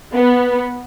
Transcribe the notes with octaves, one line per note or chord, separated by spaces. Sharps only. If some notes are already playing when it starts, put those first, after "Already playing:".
B3